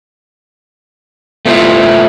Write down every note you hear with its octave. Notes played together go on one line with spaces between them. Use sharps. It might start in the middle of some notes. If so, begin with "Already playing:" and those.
A3 B3 E4 F4 C5 E5